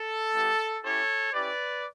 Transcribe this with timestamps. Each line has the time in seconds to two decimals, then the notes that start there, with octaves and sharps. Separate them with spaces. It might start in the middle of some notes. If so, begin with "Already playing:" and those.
Already playing: A4
0.32 G3 B3 E4 G4
0.82 C#4 E4 G4 A4 C#5
1.33 C#4 E4 G4 B4 D5